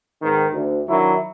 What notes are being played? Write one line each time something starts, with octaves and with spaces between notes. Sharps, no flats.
G#2 D#3 B3 C4
D2
D#3 F#3 D4 E4